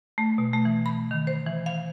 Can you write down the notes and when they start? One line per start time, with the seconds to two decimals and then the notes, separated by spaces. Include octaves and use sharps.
0.18 A3
0.38 B2
0.53 A3
0.65 E3
0.86 B5
1.11 D#3
1.27 C5
1.46 E3
1.66 F5